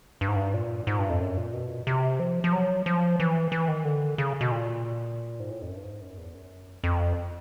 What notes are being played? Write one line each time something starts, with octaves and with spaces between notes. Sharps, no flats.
G2
G#2
G2
A#2
G#2
G2
F2
F#2
A#2
B2
C3
F3
F3
F#3
F3
E3
E3
D#3
D3
C#3
B2
A#2
G#2
A2
F2
F#2
G2
G#2
F#2
E2
F#2
F2